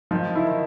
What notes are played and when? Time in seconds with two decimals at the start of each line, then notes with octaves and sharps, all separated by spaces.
0.11 D#3 F3
0.35 E4
0.47 D#3